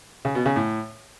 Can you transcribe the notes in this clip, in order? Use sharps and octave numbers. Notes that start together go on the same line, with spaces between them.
C#3
B2
C#3
A2